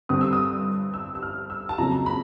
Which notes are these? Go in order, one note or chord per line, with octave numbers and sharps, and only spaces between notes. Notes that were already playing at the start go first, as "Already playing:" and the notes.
G2 D3 G3 C4 D#6
E6
D#6
E6
E6
F6
E6
A5
F2 C#3 F#3 A#3 A#5
B5